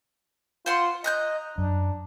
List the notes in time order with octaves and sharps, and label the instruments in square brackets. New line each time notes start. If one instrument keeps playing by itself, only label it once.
[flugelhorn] F4 [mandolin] C5 F#5 C6
[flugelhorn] D#5 [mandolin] A#5 F#6 G6
[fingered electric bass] F#2 [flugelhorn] D4